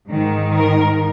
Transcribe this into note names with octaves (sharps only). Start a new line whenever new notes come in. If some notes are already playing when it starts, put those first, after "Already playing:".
G#2 D#3
A#4